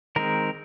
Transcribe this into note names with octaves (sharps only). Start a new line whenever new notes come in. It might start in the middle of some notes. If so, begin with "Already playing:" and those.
D#3 G#3 C4 A#4